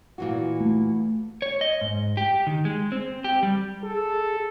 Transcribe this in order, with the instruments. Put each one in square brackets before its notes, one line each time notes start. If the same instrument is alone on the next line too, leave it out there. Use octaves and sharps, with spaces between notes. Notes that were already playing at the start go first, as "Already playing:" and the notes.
[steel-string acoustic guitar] A#2 E3 F#4
[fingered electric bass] A3
[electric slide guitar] C#5
D#5
G#2
G4
D#3
G#3
C4
G4
G3
[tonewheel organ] G#4 [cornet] A4